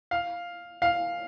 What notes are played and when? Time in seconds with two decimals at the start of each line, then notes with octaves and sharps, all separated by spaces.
0.11 F5
0.82 F5